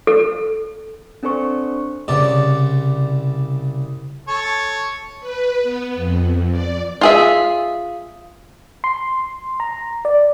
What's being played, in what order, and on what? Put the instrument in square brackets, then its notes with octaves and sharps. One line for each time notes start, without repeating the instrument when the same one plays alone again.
[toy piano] A4
[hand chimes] C4 D4 A4 C5 C#6
[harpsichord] C2 C#3 D5
[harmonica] A4 C#5
[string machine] B4
B3
F2
D5
[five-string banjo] F4 G#4 E5
[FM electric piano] C6
A#5
D5